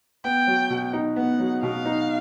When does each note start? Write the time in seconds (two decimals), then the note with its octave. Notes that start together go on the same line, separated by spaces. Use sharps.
0.24 B3 G5
0.47 F#3
0.70 B2
0.93 D#4
1.16 B3 F#5
1.39 F#3
1.63 B2 F5
1.85 D#4